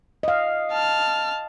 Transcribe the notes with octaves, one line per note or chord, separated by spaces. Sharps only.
D#5 F5
A5 F6